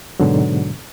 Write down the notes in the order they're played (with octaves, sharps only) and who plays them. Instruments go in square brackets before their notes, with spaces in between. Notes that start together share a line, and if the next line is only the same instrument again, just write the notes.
[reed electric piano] G#2 B2 D3 F#3